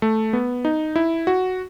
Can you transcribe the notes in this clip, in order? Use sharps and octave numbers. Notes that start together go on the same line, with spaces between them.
A3
B3
D#4
E4
F#4